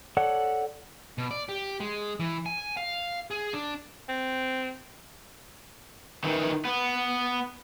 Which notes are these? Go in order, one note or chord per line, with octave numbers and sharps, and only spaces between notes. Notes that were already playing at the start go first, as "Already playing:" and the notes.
A4 C#5 D5 F#5
B2
D5
G4
G#3
E3
G#5
F5
G#4
D4
C4
D#3 E3
B3